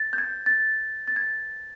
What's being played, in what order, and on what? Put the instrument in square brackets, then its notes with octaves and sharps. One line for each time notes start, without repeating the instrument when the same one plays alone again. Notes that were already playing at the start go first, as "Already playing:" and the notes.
Already playing: [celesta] A6
G6
G#6
A6
A6
G#6